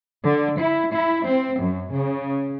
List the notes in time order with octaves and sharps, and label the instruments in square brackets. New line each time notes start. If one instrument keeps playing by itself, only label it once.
[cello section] D3
E4
E4
C4
F#2
C#3